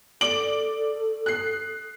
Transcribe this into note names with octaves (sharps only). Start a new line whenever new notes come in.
A4 D5 D7 F#7
F#6 C7